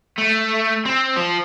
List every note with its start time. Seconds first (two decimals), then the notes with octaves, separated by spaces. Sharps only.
0.18 A3
0.85 C4
1.16 F3